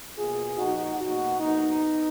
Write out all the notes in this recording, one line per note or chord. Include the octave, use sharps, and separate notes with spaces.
B2 A#3 F4 G#4
A#2 F3 A#3 D#4 F#4
B2 F#3 A#3 D#4 F#4
G#2 F3 A#3 B3 D#4